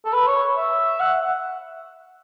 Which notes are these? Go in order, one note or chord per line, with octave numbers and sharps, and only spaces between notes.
A4
B4
C#5
E5
F#5